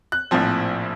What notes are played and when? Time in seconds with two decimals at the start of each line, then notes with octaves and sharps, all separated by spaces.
0.12 F#6
0.31 A#1 A2 F3 C4